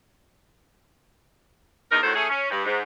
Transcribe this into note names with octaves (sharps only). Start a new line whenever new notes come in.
E2 D#4 A#4
A2 D#3 C#4 F#4 A4 C5
A3 C#4 E4 G#4
C#4
G2
G#2